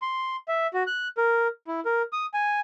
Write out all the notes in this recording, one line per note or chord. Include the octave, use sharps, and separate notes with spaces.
C6
E5
F#4
F#6
A#4
E4
A#4
D#6
G#5